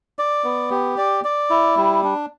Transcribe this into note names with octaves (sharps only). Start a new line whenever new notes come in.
D5
B3
G4
D5
D5
E4
G3
D4